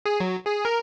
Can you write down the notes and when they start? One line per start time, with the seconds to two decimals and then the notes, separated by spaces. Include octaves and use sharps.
0.06 G#4
0.20 F#3
0.46 G#4
0.65 A#4